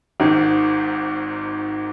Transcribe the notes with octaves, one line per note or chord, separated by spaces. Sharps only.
G#1 G#2 D#3